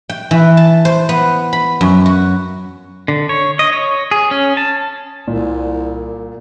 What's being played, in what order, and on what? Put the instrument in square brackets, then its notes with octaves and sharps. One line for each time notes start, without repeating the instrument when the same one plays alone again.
[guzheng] G5
E3
A5
C5
B3
B5
F#2
F#4
[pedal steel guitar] D3
C#5
D#5
C#5
G#4
C#4
A5
[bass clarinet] C2 [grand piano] A#2